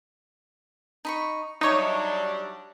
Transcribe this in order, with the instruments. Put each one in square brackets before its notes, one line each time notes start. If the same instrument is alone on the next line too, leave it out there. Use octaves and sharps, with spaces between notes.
[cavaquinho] D#4 B5 C#6
[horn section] F#3 G3 D4 [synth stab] D#4 C#5 [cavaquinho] E5 C#6 D#6